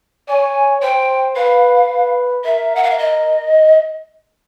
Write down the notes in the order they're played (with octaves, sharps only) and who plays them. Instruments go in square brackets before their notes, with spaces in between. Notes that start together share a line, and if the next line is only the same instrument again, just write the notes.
[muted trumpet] C#5 [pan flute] G#5
[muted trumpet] C5 [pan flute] G5
[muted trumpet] B4 [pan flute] F5
[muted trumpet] B4
[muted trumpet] A#4 [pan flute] E5
[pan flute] F#5
F5
E5
D#5